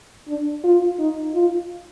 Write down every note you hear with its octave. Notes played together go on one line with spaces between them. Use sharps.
D4
F4
D#4
F4